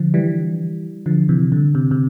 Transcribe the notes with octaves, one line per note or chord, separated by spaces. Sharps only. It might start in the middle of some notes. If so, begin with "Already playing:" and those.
Already playing: D3 F3
E3 G3
D3 F3
C3 E3
D3
C3
C3